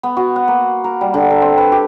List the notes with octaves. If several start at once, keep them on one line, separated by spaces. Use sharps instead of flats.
B3
F#4
F#5
A#3
A#4
G3
D3
A4
C4
B4
G4